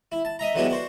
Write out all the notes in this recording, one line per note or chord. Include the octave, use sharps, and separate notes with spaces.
E4
A5
D#5 E5 A#5
D3 E3 F#3 G#3 B3 G4
D4 F#4 C5